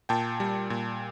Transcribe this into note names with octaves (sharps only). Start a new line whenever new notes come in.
A#2 G5 A5
G3
A#2